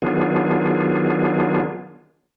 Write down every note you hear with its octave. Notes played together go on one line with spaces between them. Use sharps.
D#3 F#3 B3 D4 F4 G#4